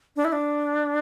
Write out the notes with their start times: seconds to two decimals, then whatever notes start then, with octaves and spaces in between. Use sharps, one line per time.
0.16 D4
0.25 E4
0.32 D4